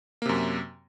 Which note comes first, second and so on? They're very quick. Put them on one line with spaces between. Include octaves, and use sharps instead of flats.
A#3 C3 F#2